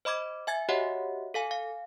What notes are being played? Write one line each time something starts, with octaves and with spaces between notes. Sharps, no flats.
C5 D#5 B5 D6 G#6
E5 G#5 G#6 A6
F#4 G4 C#5 D#5 E5 F#5
A4 F5 G#5
F5